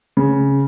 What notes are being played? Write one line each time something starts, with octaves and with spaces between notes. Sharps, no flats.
C#3